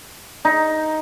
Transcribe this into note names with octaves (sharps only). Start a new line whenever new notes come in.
D#4